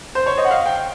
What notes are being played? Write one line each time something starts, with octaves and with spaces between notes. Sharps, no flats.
C5
C#5
D#5
F#5
F5
G5